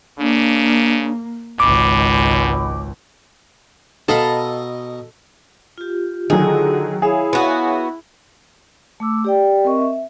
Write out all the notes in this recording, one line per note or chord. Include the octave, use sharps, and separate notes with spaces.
C#3 A#3 D4
G#1 C#2 B2 B5 D6
B2 A4 D#5 F5 A#5 B5
F4 G4
D3 D#3 F#3 G#4
E4 G#4 C#5 E5 F5
B3 F#4
A3 D6 E6
G4 D5 G5
C4 A#4 D#5 C#6
E5